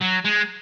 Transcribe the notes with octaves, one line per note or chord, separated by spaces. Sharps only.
F#3
G#3